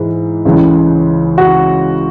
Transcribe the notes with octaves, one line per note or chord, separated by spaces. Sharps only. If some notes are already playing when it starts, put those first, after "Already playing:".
Already playing: G#2 E3
C#2 C#3 E3
F#4